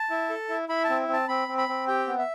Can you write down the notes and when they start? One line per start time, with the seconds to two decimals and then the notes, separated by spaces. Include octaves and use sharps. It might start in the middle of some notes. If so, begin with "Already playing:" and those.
Already playing: A5
0.10 E4
0.30 A4
0.49 E4
0.69 E4 B5
0.84 A5
0.89 C4
1.08 C4 A5
1.28 C4 B5
1.48 C4
1.58 B5
1.69 C4
1.87 G4 G5
2.07 B3
2.18 E5